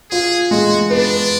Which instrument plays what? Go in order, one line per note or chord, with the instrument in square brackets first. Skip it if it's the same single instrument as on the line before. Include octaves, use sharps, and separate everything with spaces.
[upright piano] F4 [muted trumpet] G#4
[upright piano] G#3 [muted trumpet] F#4
[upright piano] B3 [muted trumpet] D4